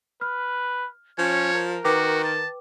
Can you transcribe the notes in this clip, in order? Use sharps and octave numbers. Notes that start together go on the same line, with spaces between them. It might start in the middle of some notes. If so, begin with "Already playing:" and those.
B4 F6
F3 C#4 C#5
A#4
D#3 F#4 B4 G5 D6
A5